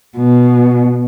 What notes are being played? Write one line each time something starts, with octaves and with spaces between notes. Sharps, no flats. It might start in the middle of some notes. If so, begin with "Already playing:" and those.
B2